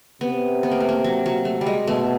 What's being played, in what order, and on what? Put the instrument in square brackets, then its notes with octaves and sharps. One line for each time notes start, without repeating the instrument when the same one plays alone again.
[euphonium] C3 [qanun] B3
[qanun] B3
A#3
A3
A#3
F#3
F#3
A3
G3
G#3
[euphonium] B2 [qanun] A3